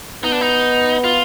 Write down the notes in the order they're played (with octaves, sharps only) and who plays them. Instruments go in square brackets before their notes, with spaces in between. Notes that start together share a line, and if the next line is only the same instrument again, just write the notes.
[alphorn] B3 [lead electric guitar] D#4
[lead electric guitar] D4
D#4
F4